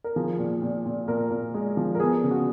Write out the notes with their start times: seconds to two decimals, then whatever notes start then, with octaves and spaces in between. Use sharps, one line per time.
0.04 A#4
0.16 F3 G#4
0.39 A#2
0.62 A#2
0.86 A#2
1.08 A#2 A#4
1.31 A#2
1.54 G#3
1.77 F3
1.95 A#4
2.00 B3 G#4
2.23 C#3
2.31 F#4